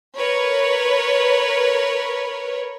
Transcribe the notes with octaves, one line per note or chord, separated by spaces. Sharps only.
A#4 B4 C#5